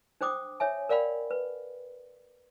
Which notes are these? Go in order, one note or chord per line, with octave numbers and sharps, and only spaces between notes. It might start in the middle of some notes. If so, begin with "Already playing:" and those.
D4 C5 G5 D6 D#6
C#5 E5 G#5
A#4 D5 F5 G5 B5
B4